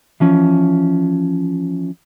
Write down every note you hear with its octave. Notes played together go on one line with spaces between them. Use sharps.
E3 F3 C#4